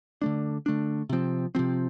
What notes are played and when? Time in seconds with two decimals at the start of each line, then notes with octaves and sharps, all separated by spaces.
0.22 D3 A3 D4
0.66 D3 A3 D4
1.09 C3 F3 C4
1.55 C3 F3 C4